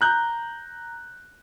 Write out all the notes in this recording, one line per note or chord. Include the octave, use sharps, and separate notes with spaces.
A#5 F#6 G6